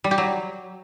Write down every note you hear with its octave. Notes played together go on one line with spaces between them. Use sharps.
G3
G4
F#3